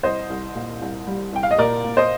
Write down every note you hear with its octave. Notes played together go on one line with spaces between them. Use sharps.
C2 C5 D#5
C2
A#2
C2
G3
C2 G5
F5
D#5
A#2 A#4 D5
A#2
C5 D#5